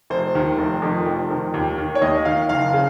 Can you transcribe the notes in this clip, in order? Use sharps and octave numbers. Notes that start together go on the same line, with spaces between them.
F1 C5
D#2 D#3
F1
F2 D#3
F1
F2 D#3
D#2
D#3
C#5
D#2 D#5
D#3 F5
F#1 F5
C#3